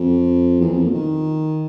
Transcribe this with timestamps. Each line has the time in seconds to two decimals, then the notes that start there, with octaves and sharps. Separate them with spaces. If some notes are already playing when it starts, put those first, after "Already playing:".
Already playing: F2
0.61 E2
0.72 F2
0.84 A#2
0.94 D#3